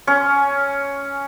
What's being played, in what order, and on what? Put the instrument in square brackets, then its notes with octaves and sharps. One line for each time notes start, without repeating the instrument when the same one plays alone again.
[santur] C#4